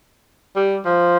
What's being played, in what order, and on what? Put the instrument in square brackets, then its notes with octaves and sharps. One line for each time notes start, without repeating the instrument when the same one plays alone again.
[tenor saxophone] G3
F3